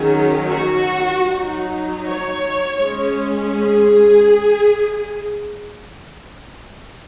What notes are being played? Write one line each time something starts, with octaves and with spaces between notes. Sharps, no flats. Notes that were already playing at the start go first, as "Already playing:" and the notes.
Already playing: D#3 F#3 C#4 G#4
F#4
F#3 D#4
C#5
G#3 C#4
G#4